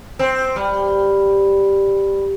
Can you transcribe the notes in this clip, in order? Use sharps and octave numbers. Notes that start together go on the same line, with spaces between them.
C4
G3